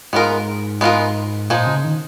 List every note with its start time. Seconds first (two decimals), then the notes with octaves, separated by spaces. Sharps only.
0.13 G#2 G#3 B3 F4 A#4
0.81 G#3 B3 F4 A#4
1.50 A#2 F3 G#3 D#4
1.67 C#3
1.84 D#3